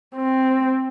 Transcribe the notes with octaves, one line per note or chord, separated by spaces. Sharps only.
C4